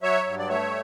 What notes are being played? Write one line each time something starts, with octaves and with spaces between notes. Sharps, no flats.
F#3 C#5 E5
G2
D5
A3 C#5 E5